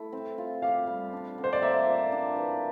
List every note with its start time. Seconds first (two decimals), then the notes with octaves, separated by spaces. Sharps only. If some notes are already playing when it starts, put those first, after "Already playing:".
Already playing: A3 E4 A4
0.12 C4
0.38 F4
0.62 G4 F5
0.87 G3
1.13 D4
1.38 D3
1.44 C5
1.53 D5
1.62 A#3 E5
1.87 F4
2.12 D4
2.36 E3